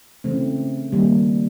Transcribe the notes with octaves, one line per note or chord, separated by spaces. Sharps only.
C#3 E3 A3 C4
D#3 G3 A#3